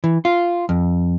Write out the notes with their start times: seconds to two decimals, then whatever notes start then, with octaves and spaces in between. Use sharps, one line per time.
0.04 E3
0.25 F4
0.69 F2